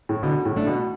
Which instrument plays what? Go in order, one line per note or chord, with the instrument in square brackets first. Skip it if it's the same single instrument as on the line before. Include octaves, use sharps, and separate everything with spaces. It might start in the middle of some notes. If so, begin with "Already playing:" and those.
[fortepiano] A2
[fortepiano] B2 [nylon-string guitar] D3
[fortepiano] A2
[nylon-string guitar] A3 D4
[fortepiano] B2